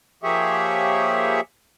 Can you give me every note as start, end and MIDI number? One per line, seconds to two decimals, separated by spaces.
0.23 1.41 53
0.23 1.41 58
0.23 1.41 67
0.23 1.41 68
0.23 1.41 73
0.23 1.41 76